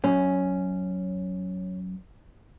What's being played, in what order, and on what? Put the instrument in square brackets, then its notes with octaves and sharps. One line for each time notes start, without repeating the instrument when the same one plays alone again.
[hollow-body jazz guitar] F#2 [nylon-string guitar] C#4